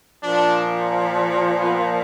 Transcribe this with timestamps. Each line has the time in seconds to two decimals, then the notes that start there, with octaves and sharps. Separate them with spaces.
0.23 A#2 F3 D4
1.58 B3